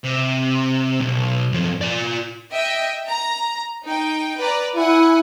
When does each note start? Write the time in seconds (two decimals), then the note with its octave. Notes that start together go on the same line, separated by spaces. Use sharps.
0.04 C3
1.00 B1
1.53 F#2 F3
1.81 F4 D5
2.51 D#5 E5 G5
3.08 A#5
3.83 D#4 G5
4.38 B4 D5 A#5
4.75 E4 F#5 G#5